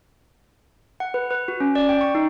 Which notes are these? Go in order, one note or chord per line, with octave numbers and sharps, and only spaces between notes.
F#5
B4
B4
F#4
C#4
D5
G5
C#6
D#4